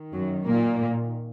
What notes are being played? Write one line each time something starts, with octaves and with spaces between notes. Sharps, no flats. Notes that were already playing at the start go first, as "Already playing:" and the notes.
Already playing: D#3
F#2 F#3
A#2 A#3